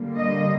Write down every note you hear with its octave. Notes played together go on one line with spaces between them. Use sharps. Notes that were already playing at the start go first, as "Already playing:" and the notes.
Already playing: D3 G3 A#3
D#5